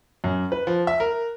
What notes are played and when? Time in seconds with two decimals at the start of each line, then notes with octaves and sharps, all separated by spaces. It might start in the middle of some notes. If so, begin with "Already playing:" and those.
0.24 F#2
0.52 B4
0.67 F3
0.87 E5
1.00 A#4